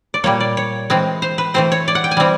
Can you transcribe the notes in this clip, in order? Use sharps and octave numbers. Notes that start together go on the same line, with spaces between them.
D5
A#2 G3 A#3 C#5
D5
C#5
E3 G#3 C4
C5
B4
E3 A3 C4 C5
C#5
D5
F#5
G5
G#5
E3 G3 C4